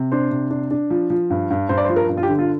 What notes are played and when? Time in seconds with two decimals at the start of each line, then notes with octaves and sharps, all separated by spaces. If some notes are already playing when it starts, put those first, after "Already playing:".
Already playing: C3
0.12 D4 C5
0.31 C3
0.51 D4
0.71 D4
0.90 F3
1.10 F3
1.30 G2
1.51 G2
1.69 G2 C5
1.78 D5
1.85 C5
1.89 F3
1.96 A#4
2.09 G2
2.17 F4
2.23 G4
2.29 D3
2.39 F4